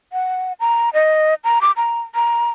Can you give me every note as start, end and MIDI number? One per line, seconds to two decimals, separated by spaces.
0.13 0.53 78
0.60 0.90 82
0.94 1.34 75
1.44 1.59 82
1.62 1.72 86
1.77 2.00 82
2.15 2.50 82